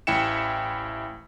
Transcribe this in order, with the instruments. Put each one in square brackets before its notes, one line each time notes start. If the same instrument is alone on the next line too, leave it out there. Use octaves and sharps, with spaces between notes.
[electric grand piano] A1 E4 E5 G5 C#7 E7